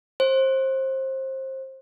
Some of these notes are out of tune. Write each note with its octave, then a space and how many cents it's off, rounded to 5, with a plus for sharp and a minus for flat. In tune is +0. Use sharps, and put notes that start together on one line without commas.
C5 +25